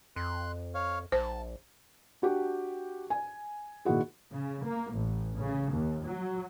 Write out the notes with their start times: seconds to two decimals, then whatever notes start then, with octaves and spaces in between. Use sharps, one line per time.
0.16 F2 C6 F#6
0.74 C#5 F5
1.12 A#1 C5 A5
2.22 D4 F#4 G4
3.10 G#5
3.85 A#2 D#3 E4 F#4 G#4
4.32 C#3
4.63 A#3
4.93 A1
5.38 C#3
5.71 D#2
6.03 F#3